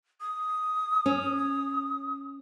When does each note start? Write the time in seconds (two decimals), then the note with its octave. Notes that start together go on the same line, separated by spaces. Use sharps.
0.21 D#6
1.06 C#4